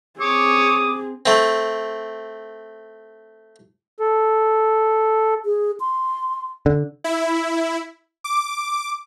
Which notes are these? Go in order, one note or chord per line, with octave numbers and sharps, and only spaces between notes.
C4 G#4 C#5 D6 D#6
A3 C4
A4
G#4
C6
D3
E4
D6